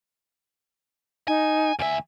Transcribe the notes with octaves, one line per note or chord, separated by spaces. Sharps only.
D#4 G#5
D2 E5 G#5